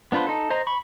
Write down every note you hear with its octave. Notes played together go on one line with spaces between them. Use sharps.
B3 D4 F4 B4 C5
D#4 A4
C5 D#5 A#5
B5 C#6